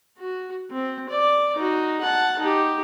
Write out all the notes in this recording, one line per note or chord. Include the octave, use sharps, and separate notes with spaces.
F#4
C4
D5
D#4 F#4
F#5 A5
D#4 G4